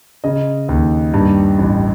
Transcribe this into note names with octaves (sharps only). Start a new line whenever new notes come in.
C#3 D#5
D#2
G2
A1